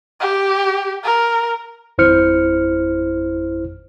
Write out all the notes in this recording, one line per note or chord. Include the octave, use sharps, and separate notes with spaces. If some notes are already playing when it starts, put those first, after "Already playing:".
G4
A#4
G#1 F2 E4 C5 F6 C#7